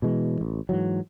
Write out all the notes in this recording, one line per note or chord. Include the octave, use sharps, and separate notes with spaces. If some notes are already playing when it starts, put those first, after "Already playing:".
B2 E3 G#3
A1
G#2 E3 F#3